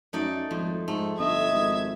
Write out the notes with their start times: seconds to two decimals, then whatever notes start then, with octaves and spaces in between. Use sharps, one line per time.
0.13 F#2 A3 D#4 D5
0.51 G#1 F2
0.88 G#2 A3
1.19 G1 D#5 E5 G#6
1.52 G#1